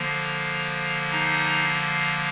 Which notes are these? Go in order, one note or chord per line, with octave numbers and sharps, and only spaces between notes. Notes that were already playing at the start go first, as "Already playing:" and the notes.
Already playing: D3 F3 A#3
D#4